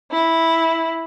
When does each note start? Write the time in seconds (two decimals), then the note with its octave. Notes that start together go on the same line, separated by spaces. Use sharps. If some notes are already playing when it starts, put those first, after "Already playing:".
0.11 E4